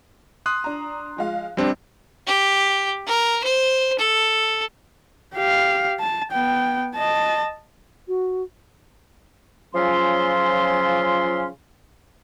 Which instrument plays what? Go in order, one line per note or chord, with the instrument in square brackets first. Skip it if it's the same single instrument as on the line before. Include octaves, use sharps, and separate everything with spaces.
[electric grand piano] C6 D#6 F#6
[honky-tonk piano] D4 A#5
F3 G#3 F5
[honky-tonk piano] A#1 D3 [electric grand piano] G3 C4 D4
[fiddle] G4
A#4
C5
A4
[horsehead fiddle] G4 F5
A5
B3 G5
D#5 A5
[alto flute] F#4
[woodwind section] C#3 F3 F#3 C#4 F4 C6